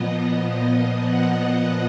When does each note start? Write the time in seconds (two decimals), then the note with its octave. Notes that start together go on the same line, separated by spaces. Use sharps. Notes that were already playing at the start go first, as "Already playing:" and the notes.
Already playing: A#2 F3 B3 D#5
1.08 F#5